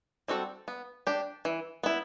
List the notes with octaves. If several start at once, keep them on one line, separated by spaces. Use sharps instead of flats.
G3 C4 F#4 A4
B3
D4 G4
E3
B3 E4